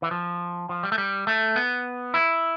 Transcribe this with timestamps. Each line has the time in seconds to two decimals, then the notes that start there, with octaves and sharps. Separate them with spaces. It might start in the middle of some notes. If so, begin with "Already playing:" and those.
0.02 E3
0.11 F3
0.69 F3
0.83 G3
0.92 A3
0.98 G3
1.27 A3
1.56 B3
2.14 E4